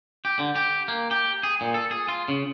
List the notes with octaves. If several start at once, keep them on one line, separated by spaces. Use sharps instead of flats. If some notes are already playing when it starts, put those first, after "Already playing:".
G4
D3
G4
A#3
G4
G#4
A#2
A4
G#4
F4
C#3